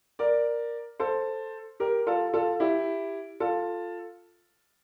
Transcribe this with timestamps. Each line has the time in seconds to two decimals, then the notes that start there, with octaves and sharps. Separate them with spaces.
0.19 A#4 D5
1.00 A4 C5
1.80 G4 A#4
2.07 F4 A4
2.33 F4 A4
2.60 E4 G4
3.40 F4 A4